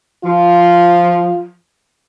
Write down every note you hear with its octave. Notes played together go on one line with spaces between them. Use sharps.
F3 F4